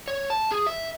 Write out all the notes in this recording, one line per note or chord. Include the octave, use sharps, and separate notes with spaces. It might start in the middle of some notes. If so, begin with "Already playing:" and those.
C#5
A5
G#4
E5